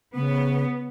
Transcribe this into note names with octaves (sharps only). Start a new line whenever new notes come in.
C#3 B3